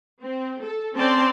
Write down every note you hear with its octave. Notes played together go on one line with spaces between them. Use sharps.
C4
A4
C4 C#4 C5 D5 A5 C6